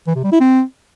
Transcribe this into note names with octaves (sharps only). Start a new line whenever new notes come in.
E3
C3
G3
E4
C4